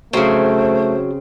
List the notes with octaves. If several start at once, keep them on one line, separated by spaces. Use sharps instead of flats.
C#3 F#3 A3 C4 C5